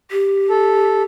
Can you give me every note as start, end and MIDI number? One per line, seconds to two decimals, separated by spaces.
0.11 1.03 67
0.50 1.03 69